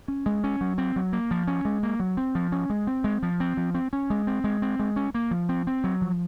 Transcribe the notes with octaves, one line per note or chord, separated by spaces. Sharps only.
C#4
G#3
C#4
F#3
C4
F#3
A#3
F3
C#4
G#3
A#3
F#3
C4
F3
C#4
G#3
C4
G#3
F3
C4
F3
C4
C#4
G#3
C4
G#3
C4
G#3
C#4
A#3
F3
C4
C4
F#3
F3